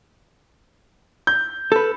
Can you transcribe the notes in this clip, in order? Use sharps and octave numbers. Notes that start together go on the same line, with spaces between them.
G6
A4 B4